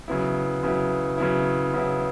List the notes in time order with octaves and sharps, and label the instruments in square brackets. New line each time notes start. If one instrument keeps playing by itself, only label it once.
[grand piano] C#3 F#3 B3 E4
C#3 F#3 B3 E4
C#3 F#3 B3 E4
C#3 F#3 B3 E4